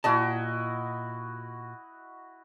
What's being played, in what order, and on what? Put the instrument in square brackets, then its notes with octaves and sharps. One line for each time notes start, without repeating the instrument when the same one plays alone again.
[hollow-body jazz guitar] A#2 D5 A5 [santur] E4 F#4 D#5